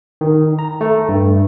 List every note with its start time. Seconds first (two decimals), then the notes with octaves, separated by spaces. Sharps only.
0.21 D#3
0.59 A#5
0.81 A3
1.09 G2